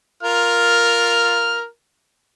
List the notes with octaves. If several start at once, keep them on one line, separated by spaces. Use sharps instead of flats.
F4 A#4 F6